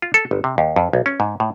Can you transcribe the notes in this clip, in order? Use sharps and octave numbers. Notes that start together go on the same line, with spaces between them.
F4
A4
G1
C3
D#2
F2
B1
C#4
G#2
A2